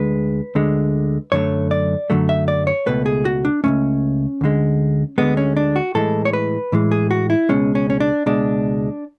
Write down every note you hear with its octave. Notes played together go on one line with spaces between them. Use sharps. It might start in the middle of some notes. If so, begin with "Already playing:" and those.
Already playing: D2 D3 G#3 B4
D2 D3 G#3
F#2 D3 F#3 A3 C#5
D5
F#2 D3 F#3 A3
E5
D5
C#5
C#2 B2 A3 B4
G#4
F#4
D4
C#2 B2 A3 C#4
D2 D3 G#3
D2 D3 G#3 B3
C#4
D4
F#4
A2 E3 G#3 A4
C#5
B4
A2 E3 G#3
G#4
F#4
E4
C#2 B2 G#3 C#4
C#4
C#4
D4
C#2 B2 G#3 D4